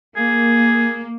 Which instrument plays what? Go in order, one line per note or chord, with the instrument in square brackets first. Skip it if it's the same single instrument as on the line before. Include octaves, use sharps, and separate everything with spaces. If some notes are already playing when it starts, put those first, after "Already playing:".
[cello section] A#3 [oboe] G#4